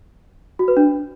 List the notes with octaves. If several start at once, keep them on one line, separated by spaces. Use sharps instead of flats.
F#4
B4
D4